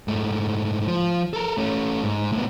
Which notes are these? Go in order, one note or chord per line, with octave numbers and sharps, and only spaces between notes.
G#2 A3
F3
A4 A#4
A3 C#4
G#2
A2 B3